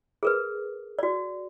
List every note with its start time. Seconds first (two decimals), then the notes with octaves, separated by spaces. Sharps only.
0.23 G#4 A#4 B4
0.99 F#4 D5